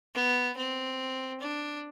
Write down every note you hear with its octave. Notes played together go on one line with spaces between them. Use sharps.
B3
C4
D4